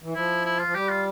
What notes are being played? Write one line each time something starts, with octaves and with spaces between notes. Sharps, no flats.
E3
F3 E4
E4
F4
F3
G3 G4
F4